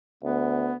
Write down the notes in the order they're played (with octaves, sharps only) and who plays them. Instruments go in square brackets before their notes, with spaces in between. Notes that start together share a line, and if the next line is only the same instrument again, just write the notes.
[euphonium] D2 [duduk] B3